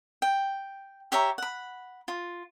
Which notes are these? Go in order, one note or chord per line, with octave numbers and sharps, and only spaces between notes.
G5
G4 C#5 E5 A#5
F#5 B5
F4